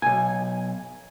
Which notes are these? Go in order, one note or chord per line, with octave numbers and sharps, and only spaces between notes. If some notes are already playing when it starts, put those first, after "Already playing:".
B1 G#5